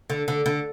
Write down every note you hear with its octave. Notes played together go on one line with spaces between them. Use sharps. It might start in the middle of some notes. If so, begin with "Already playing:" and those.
D3
D3
D3